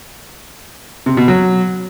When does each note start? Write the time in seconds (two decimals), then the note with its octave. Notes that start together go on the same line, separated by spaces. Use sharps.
1.06 C3
1.17 B2
1.28 F#3